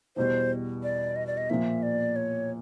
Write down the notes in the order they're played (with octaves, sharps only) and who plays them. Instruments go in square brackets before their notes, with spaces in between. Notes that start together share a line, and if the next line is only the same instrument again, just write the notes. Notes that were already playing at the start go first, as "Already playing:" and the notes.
[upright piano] E2 B2 G3 [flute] C5
[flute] D5
D#5
D5
D#5
[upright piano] A#2 F3 A#3 [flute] E5
[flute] D5
C#5